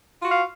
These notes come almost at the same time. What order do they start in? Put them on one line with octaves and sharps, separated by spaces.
F4 F#4 F5